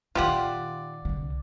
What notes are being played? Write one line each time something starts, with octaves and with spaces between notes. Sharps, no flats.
A#2 D#3 F4 G4 D5 F#5
C2 D3